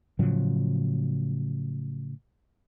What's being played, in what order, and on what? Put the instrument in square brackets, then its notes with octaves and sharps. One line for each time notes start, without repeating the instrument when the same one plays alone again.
[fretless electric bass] A2 C#3 F3 F#3